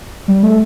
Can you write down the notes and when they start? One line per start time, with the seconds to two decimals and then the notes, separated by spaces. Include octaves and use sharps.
0.28 G3
0.43 A3